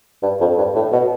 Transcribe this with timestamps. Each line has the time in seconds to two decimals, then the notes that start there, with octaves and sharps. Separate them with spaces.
0.23 G2
0.40 F2
0.58 G2
0.75 A2
0.92 B2